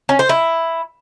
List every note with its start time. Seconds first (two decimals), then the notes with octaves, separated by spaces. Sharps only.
0.09 C#4
0.19 C5
0.29 E4